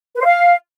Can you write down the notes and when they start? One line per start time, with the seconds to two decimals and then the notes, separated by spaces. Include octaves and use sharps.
0.15 B4
0.20 C5
0.26 F5